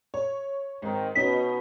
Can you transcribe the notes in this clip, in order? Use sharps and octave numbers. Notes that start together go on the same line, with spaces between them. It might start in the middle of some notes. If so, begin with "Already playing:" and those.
C#5
G#2 D#3 C4 D#4
B2 C#4 D#4 D#5 B6